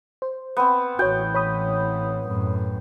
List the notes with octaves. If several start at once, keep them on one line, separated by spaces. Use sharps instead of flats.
C5
B3 C4
A1 E3 F#4 C#5 G5
C#5 B5 D#6
F#2 A2